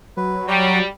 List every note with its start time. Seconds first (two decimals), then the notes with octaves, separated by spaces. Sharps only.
0.17 F#3 B4
0.47 G3 F#4 G5 A#5